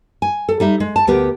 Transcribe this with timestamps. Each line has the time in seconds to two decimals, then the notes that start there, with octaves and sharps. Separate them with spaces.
0.22 G#5
0.49 A4
0.60 G3 D#4 E5
0.80 G#3
0.96 A5
1.07 D2 B3 G4 A#4